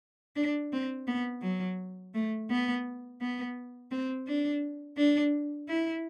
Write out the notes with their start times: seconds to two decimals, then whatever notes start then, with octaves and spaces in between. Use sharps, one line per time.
0.36 D4
0.73 C4
1.07 B3
1.42 F#3
2.14 A3
2.50 B3
3.21 B3
3.91 C4
4.27 D4
4.97 D4
5.69 E4